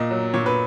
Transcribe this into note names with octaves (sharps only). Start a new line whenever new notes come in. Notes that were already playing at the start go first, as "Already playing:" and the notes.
Already playing: A#2 D#5
F#3
A#2 C#5
B4